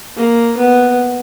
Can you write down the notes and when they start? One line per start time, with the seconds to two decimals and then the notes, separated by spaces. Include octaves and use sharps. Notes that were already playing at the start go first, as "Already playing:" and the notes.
0.16 A#3
0.57 B3